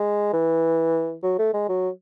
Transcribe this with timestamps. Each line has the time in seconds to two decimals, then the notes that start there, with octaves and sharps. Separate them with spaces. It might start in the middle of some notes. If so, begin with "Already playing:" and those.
Already playing: G#3
0.33 E3
1.23 F#3
1.39 A3
1.53 G#3
1.69 F#3